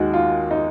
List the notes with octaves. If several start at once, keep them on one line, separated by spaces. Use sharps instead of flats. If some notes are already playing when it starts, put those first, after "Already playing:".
Already playing: D#2 D#3 G#3 F#4
F4
D#4